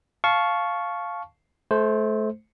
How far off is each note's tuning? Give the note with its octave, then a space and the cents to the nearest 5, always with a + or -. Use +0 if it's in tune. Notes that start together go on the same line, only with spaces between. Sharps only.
F5 +0 A5 -15 C#6 +0
A3 -30 C5 +0